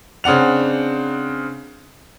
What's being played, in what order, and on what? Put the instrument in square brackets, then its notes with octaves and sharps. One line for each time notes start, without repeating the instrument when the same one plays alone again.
[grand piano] C#3 C4 D4 F#5 F7